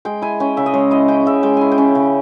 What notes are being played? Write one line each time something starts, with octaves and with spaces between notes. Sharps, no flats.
G#3 G5
E4 G#5
C#4 G5
C#3 E5
D#5
G#3 C#5
E4 D#5
C#4 G5
C#3 E5
G#3 G5
E4 G#5
G5
C#4
C#3